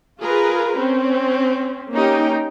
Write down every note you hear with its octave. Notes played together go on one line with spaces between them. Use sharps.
F4 G#4 A#4 B4
C4 C#4
A#3 C#4 D#4 G4 G5